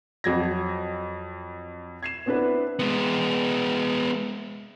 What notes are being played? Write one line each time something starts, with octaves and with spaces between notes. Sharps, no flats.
F2 F#3 G#6 A#6
G#6 C7 E7
B3 C4 D4 E4 B4
G#3 B3